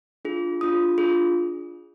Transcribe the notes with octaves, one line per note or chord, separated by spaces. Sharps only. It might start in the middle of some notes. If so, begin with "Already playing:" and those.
D4 F4 G#4
D4 F4 G#4 D#6
D4 F4 G#4